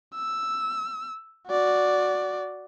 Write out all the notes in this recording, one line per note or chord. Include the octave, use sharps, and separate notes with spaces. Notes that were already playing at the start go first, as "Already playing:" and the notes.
E6
F#4 D5